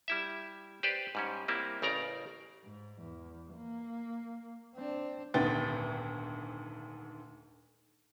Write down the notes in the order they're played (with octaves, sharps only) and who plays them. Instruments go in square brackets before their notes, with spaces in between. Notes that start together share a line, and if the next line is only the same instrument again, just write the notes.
[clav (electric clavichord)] G3 E4 E5
G4 B4 C5 D5
G#2 G3 C#4
G3 A#3 C4 E4
A1 C#3 A#4 D5 A#5
[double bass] G#2
E2
A#3
C4 D4
[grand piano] D#1 D2 G#2 B3 G5 A6